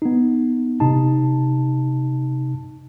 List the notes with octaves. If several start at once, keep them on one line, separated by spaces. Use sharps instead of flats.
B3 D#4
C3 D#4 A5